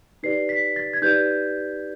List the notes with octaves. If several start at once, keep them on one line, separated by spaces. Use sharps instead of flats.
D#4 G4 B4 D5 C7
B6
A6
G#6
D#4 G4 B4 D5 G6